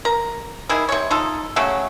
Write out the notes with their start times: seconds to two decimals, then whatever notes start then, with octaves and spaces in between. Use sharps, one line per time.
0.05 A#4 A#5
0.69 D#3 G3 E4 G#4
0.89 C3 C#5
1.11 D#4 F4 A4
1.56 C#3 F#3 A3 C#4